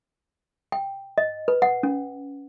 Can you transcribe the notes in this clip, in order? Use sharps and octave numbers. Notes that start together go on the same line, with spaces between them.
G5
D#5
B4
F#5
C#4